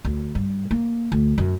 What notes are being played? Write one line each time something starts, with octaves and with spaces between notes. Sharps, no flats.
D2
G2
A#3
D2
F#2